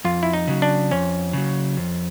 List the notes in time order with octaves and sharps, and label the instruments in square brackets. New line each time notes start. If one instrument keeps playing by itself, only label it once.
[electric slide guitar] F2 [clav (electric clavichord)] F4
[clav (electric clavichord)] E4
D#4
[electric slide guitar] C#3 F#3
[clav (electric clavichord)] D4
[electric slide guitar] F2 [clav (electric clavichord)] C#4
[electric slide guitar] C#3 F#3
F2